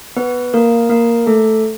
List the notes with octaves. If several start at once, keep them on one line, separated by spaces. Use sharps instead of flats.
B3 B4
A#3 A#4
A#3 A#4
A3 A4